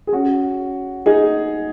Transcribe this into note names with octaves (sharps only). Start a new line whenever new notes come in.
G#4
C#4 F#4
D#4 G#4